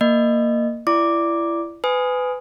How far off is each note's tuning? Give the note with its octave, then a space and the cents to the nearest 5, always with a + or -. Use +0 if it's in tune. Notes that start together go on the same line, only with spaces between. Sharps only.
A#3 -5 D#5 -25
E4 +30 D5 +0 D6 +0
B4 +25 G#5 +0 D#6 +0